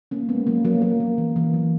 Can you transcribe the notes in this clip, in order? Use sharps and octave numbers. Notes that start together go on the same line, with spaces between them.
A#3 C#4
G#3 B3
F#3 A#3
F#3 A#3
B3
F#3 A#3
F#3
E3
E3
F#3